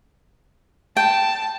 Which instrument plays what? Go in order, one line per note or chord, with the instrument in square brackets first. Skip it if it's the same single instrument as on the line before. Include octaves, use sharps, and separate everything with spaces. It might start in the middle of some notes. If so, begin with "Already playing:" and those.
[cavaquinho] G5 [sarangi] A5